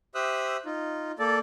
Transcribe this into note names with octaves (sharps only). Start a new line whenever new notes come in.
G4 C5 E5 D#6 E6 F#6
D#4 F4
A#3 A4 D5